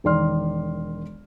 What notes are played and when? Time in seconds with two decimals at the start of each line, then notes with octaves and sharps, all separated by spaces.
0.04 E1 D#3 D5 C6 F6